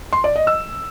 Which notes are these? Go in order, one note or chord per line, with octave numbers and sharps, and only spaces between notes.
C6
D5
D#5
E6